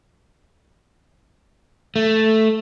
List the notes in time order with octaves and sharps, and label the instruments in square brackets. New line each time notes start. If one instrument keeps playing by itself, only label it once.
[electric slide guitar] A3